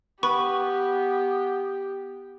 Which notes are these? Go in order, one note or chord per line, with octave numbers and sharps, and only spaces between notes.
B3 G4 B4 C#6